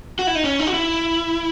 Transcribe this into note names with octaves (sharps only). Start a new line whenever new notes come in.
F#4
E4
D#4
C#4
D#4
F#4
E4